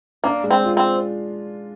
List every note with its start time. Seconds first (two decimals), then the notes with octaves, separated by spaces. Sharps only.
0.24 A#3 D4
0.43 G#3
0.51 C4
0.65 F4
0.77 C4